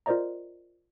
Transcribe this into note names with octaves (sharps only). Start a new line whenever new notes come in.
F4 A#4 C5 D5 D#5 A#5